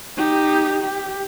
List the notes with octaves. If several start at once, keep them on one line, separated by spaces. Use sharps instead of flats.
D#4 G4
G4